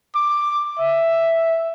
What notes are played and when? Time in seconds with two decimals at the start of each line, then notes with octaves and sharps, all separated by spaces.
0.15 D6
0.79 E5